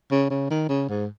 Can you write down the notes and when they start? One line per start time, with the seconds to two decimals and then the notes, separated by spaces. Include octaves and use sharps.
0.11 C#3
0.30 C#3
0.50 D#3
0.69 C#3
0.89 G#2